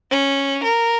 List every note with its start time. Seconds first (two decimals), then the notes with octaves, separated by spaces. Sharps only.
0.11 C#4
0.63 A#4